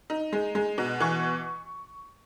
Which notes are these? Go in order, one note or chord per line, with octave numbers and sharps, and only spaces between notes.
D#4
G#3
G#3
B2
E3 C#6